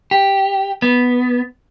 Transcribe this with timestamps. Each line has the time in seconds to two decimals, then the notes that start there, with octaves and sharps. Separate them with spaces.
0.11 G4
0.82 B3